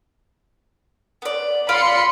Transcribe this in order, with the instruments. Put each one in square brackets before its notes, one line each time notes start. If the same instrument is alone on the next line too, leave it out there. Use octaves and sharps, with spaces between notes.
[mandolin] B3 D5
[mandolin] F4 D5 F6 [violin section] B5 C6 C#7